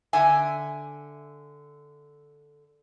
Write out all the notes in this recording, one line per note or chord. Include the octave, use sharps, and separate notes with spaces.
D3 E5 G#5